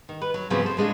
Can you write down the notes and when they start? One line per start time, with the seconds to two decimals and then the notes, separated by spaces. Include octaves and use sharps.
0.09 D#3
0.22 B4
0.34 F#3
0.50 G#2 C#3 F3 F#3 B3 C4
0.62 A4 C5
0.77 A2 G#3 D4 F4